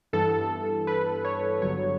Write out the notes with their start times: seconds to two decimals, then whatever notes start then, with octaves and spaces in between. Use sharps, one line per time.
0.13 G2 E3 B3 A4
0.87 B4
1.25 C#5
1.62 G1 G2 D3 F#3 B3 C#5